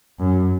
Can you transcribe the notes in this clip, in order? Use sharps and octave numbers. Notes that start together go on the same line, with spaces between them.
F#2